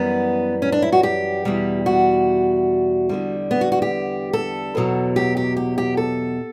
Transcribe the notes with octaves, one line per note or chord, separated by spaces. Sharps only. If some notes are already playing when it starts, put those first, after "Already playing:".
Already playing: F#2 E3 G3 B3
C#4
D4
E4
F#4
G4
E2 B2 G3
F#4
E2 D3 G3
B3
F#4
F#4
G4
A4
E2 B2 F#3
G4
G4
G4
G4
A4